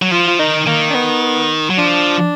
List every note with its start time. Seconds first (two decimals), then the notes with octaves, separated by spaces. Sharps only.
0.02 F#3
0.11 F3 F4
0.28 F4
0.39 D#3 D#4
0.67 D#3 A#3
0.90 D4
0.95 B3
1.70 F#3
1.78 F3 D4